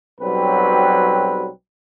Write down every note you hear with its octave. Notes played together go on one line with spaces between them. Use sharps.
B1 F#3 G3 C4 B4